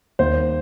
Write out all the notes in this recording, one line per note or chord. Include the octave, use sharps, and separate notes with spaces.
D#2 C5